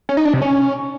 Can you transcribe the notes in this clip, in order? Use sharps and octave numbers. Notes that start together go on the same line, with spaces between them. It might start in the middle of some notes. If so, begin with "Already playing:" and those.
C#4
D#4
D4
C3
C#4